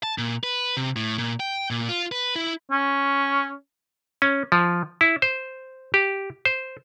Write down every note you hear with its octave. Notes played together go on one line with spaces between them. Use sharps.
A5
A#2
B4
C3
A2
A#2
G5
A#2
F4
B4
E4
C#4
C#4
F3
E4
C5
G4
C5